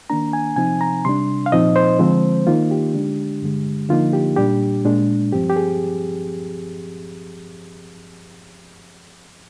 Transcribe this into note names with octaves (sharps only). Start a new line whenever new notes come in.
D#3 A#3 D4 A#5
G#5
C3 F3 C4 D#4 G#5
A#5
C3 G3 D4 C6
F5
A#2 F3 C4 D#4 D#5
C5
D3 F3 G#3 C4
D#3 A#3 D#4 F4
G4
D3 G#3 D4
G2 D3 G#3
D3 F3 A#3 D#4 F4
G4
A#2 G3 D4 G4
A#2 G#3 D4
G2 F3 C4 G4
G4
G#4